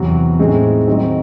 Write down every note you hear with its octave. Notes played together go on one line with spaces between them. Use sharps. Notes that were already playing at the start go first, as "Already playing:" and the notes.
Already playing: E2 C3 F#3
A2 G#3 C4 D#4 G#4
D#3 F#3 C4 D#4